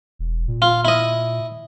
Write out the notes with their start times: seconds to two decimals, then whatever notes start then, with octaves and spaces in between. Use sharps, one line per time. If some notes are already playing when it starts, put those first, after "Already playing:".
0.19 E1
0.48 A#2
0.62 F4
0.85 E4 D#5